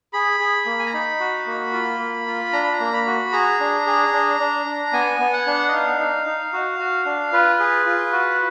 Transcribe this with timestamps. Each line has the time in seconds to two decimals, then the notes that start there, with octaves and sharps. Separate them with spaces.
0.13 G#4 B5
0.40 G#4
0.66 A#3
0.79 G#5
0.86 A#5
0.93 D#4 B5
1.20 F#4
1.47 A#3
1.73 F4
1.99 A#3
2.27 F4
2.53 D4 A#5
2.63 B5
2.73 A#5
2.80 A#3
2.93 B5
3.06 F#4
3.32 G#4 A#5
3.60 D4
3.87 G#4
4.13 D4
4.40 D4
4.66 D4
4.93 B3 G#5
5.20 B3
5.33 F#5
5.47 D4
5.69 D#5
5.72 D#4 F5
6.00 D#4
6.26 D#4
6.53 F#4
6.79 F#4
7.06 D4
7.33 F4 B4
7.60 G#4
7.86 F4
8.12 F#4